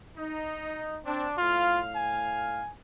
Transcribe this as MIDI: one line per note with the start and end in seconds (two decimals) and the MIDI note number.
0.17 0.96 63
1.06 1.26 60
1.06 1.35 62
1.38 2.61 45
1.38 1.80 65
1.38 2.61 77
1.96 2.71 80